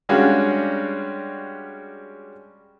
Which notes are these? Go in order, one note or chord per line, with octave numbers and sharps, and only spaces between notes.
G3 G#3 C#4 D4 F#4 F5